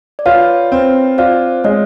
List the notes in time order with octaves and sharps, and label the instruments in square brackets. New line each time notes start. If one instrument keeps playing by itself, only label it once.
[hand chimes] D5
[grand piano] F4 [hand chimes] B4 C#5
[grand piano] C4
[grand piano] F4 [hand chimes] C5 D5
[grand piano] G#3 [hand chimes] C#5 D#5